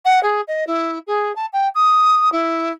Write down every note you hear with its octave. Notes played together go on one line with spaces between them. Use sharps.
F#5
G#4
D#5
E4
G#4
A5
G5
D#6
E4